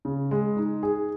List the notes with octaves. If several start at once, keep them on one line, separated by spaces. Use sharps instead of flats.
C#3
G#3
D#4
G#4